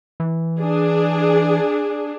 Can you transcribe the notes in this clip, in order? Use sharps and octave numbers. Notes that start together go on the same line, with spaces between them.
E3
D4 G#4